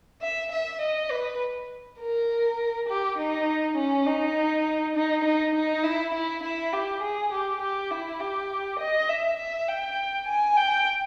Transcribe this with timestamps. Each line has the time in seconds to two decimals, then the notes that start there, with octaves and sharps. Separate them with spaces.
0.22 E5
0.52 E5
0.81 D#5
1.11 B4
1.99 A#4
2.88 G4
3.18 D#4
3.77 C#4
4.06 D#4
4.95 D#4
5.24 D#4
5.54 D#4
5.83 E4
6.14 E4
6.43 E4
6.72 G4
7.02 G#4
7.32 G4
7.61 G4
7.91 E4
8.20 G4
8.79 D#5
9.09 E5
9.38 E5
9.68 G5
10.27 G#5
10.57 G5